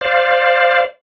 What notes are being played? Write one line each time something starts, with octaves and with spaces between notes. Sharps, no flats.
C5 D5 F5